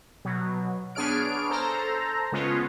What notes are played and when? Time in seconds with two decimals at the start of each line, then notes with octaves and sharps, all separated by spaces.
0.25 B2 F#3
0.95 B3 D4 G#4 C#5 F6 D7
1.50 A4 C5 A#5
2.32 C#3 G#3 B3 C#4 F4